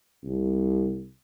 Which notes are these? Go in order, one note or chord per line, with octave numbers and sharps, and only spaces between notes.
C2